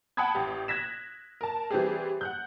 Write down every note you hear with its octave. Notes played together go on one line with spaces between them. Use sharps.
F#5 G5 A5 B5 D#6 G#6
A1 G4
F#6 G#6 A#6 B6 E7
A#4 A5
E3 G3 C4 G4 G#4
F#5 F#6 G6